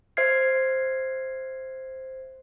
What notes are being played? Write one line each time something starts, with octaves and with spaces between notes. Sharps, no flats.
C5 E5 F6 G#6 C7